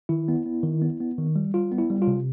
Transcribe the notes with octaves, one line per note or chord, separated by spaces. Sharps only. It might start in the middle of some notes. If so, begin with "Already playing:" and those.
D#3 E4
B3
B3
D#3
B3
B3
D#3
G3
G3 F4
B3
E4
G3
F4
C3